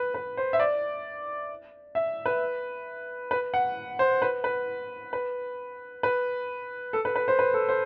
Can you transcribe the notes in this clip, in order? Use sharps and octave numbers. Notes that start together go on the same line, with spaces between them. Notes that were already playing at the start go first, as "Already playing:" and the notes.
Already playing: B4
B4
C5
E5
D5
E5
B4
B4
F#5
C5
B4
B4
B4
B4
A4
B4
B4
C5
B4
A4
C5